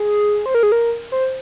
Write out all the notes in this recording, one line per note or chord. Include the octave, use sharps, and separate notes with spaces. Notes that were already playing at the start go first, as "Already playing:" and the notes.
Already playing: G#4
C5
A#4
G#4
A#4
C5